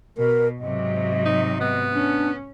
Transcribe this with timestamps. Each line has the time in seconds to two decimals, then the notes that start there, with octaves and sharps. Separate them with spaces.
0.18 B2 A#4
0.60 G#2 C3 F#3 D#5
1.26 D#4
1.61 B3
1.93 C#4 D4